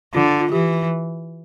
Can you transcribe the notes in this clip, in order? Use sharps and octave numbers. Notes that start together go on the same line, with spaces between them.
D3 F4
F4
E3 G4